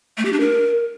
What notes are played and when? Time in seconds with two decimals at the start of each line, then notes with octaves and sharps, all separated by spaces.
0.18 A3
0.25 G4
0.33 D4
0.40 A#4